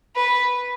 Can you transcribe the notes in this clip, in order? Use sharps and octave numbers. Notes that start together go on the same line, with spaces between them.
B4